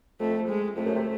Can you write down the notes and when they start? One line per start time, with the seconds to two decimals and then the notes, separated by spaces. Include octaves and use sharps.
0.20 F2 A3
0.49 G#3
0.76 F2 A3
0.86 F#2
0.96 C3